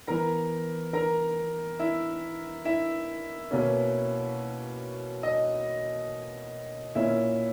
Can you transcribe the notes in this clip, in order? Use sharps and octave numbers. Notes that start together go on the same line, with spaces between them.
E3 B3 A#4 A#5
A#4 A#5
E4 E5
E4 E5
B2 A#3 C#4
D#5
A#2 A#3 C#4 E4 E5